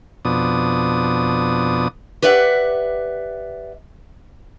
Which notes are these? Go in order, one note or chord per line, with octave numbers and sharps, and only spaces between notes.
F2 B2 D4 D#6
G4 B4 D5 E5 F#5